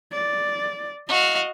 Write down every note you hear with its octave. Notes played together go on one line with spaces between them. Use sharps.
D5
F#4 D#5 F5